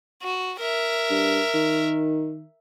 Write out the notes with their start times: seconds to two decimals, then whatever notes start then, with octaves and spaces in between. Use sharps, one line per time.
0.23 F#4
0.59 A#4 E5
1.10 G2
1.54 D#3